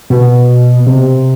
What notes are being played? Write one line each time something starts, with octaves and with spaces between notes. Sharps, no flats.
B2
C3